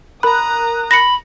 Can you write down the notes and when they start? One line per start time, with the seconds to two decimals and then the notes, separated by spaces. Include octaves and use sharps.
0.23 A#4 A#5 B5 D#6 F#6
0.91 B5 A#6 C#7